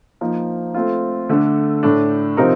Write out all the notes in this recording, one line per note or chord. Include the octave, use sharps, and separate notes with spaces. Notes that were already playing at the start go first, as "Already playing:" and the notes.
F3 A#3 D#4
A3 C4 F4
D3 A3 D4 A4
A2 A3 D4
C3 F3 C4 D#4 A#4